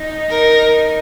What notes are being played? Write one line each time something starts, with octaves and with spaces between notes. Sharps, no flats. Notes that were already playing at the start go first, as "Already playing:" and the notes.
Already playing: D#4
A#4